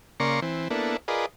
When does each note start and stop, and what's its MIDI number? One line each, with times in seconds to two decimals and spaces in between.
0.20 0.40 49
0.20 0.40 58
0.20 0.40 74
0.20 0.40 82
0.20 0.40 84
0.20 0.40 85
0.42 0.68 52
0.42 0.68 60
0.70 0.97 58
0.70 0.97 59
0.70 0.97 62
0.70 0.97 64
0.70 0.97 69
1.08 1.26 65
1.08 1.26 68
1.08 1.26 70
1.08 1.26 71
1.08 1.26 74
1.08 1.26 75